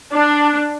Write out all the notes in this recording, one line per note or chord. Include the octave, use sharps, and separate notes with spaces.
D4